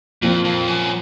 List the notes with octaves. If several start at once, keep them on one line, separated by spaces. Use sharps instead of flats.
F2 A#2 F3 C4
F2
F#2